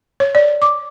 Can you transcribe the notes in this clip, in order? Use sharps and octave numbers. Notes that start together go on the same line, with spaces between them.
C#5
D5
D6